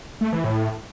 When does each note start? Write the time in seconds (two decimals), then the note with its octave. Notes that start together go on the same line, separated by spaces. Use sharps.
0.21 A3
0.33 E3
0.44 A2